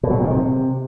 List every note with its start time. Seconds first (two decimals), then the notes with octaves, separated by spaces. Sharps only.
0.03 B2
0.10 F#3
0.17 A#2
0.24 D#3
0.31 C3